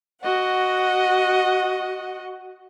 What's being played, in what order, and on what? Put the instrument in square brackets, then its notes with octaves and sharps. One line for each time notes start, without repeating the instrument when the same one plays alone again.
[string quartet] F#4 D#5 F#5